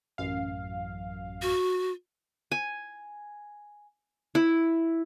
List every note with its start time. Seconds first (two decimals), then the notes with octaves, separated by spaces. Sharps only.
0.18 A1 F#2 F5
1.42 F#4
2.52 G#5
4.35 E4